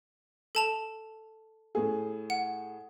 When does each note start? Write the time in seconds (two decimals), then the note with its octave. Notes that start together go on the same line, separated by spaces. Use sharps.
0.55 A4 A5 F7
1.75 A2 G#4
2.30 F#5